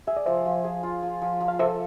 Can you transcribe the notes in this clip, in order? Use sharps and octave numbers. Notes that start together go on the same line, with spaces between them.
G#4 E5
D5
F3 C5 E5
F3
G#4
F4
F3
F3
F3
F5
A4 C5 E5